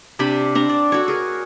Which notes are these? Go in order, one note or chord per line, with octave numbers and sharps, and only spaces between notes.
C3 D4 G4 B5
C4 D4 A#5
D5
F#4 A4 C#5
G#4 A#4